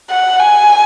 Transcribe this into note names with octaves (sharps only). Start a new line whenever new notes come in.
F#5
G#5